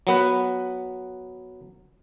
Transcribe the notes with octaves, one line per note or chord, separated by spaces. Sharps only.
F#3 B3 B4